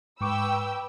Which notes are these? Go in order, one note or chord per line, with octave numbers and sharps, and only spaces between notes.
G#2 B4 G5 C#6 D6 E6